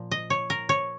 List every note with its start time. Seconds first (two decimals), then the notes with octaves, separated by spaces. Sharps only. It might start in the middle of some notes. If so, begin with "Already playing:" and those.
Already playing: A#2 F3
0.11 D#5
0.30 C#5
0.50 A#4
0.69 C#5